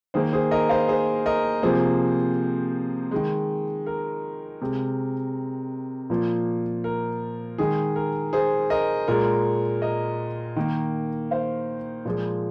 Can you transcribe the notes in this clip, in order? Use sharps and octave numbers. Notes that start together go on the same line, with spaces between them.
D#3 A#3 G#4 C5
G#4 C5
A#4 D#5
C5 F5
G#4 C5
A#4 D#5
C3 F3 A#3 G#4 C5
D#3 G#3
A#4
C3 G#3
A#2 F3 A#3
A#4
D#3 G#3 G#4
A#4
G#4 C5
A#4 D#5
A#2 G#3 A#4
A#4 D#5
D#3 A#3
C5 F5
A#2 F3 G#3